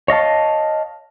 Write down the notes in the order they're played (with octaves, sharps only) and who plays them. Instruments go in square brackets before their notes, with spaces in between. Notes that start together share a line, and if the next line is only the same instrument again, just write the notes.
[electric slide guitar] C#5 D#5 F5 A5